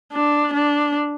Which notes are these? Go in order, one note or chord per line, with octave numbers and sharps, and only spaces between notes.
D4
D4